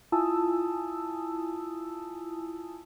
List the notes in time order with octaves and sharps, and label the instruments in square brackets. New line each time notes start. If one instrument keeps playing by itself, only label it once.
[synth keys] E4 F4 G#5 A5 D#6 E6